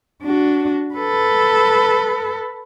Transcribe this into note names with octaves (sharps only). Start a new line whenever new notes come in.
D4 F#4
A4 B4